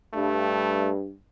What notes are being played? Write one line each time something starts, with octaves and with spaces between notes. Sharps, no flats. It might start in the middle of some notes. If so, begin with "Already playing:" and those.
G2 A3